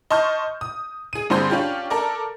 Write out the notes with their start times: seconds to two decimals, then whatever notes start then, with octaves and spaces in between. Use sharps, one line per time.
0.11 D#5 A5 C6 C#6 F6 G6
0.61 D#6
1.13 G#4 D#7
1.30 G2 D3 C4 G#4 C6 G6
1.50 C#4 D4 F4 G4
1.90 A4 A#4 D5